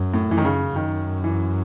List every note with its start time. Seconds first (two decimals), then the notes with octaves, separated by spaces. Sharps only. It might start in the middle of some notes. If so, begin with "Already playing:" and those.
Already playing: F#2
0.14 A2
0.29 F#2 E3
0.38 D#3
0.45 C#3
0.76 F#2 D#3
1.24 E3